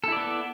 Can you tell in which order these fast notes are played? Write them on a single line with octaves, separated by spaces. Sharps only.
A4 E4 D5 B3